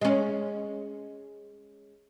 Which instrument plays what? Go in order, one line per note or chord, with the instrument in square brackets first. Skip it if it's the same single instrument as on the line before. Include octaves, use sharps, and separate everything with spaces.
[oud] G#3 C#4